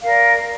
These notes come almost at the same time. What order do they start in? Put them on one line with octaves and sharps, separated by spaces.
F5 A#4 D5